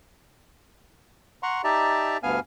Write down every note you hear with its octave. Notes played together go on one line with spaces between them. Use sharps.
F#5 A#5 C6 C#6
D#4 G4 D5 E5 A5 A#5
D2 G2 B3 F5 G#5 F6